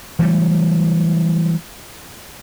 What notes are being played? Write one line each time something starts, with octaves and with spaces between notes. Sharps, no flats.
E3 F#3 G3 A3